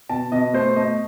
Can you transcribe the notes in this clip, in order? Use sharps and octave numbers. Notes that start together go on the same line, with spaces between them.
B2 A5
B2 D#5
A3 C5
A3 D#5